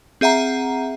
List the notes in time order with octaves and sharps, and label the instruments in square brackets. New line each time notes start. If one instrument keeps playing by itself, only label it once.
[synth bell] C4 G#4 E5 F#5 A#5